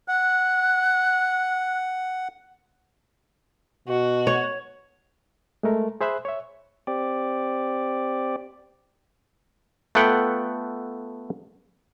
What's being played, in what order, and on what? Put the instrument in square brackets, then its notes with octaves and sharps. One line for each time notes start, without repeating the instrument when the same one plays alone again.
[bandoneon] F#5 [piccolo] F#6
[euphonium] B2 [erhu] F#4
[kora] C#5
[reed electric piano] G#3 A3 A#4
G#4 C5 E5 B5 F#6
C#5 E5
[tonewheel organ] C4 G4 D5
[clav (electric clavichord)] A3 B3 F4 A4 F#5 G5